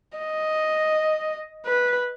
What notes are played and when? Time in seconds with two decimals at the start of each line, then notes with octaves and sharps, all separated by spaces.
0.18 D#5
1.66 B4